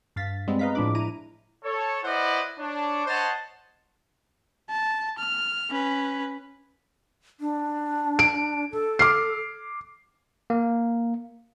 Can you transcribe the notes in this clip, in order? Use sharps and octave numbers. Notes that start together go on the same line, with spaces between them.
G2 F5 A6 B6
G3 G#3 B3 C4
B4 D#5 F5 A#5 B6
A2 F3 G#3 D4 B5 D6
E4 A#5 D#7
A4 C#5
E4 B4 C5 D5 D#5 F#5
D4 C#5
C5 C#5 D#5 F#5 A5
A5
F6
C#4 B4
D4
D7
A4
D6 F6 C7
A#3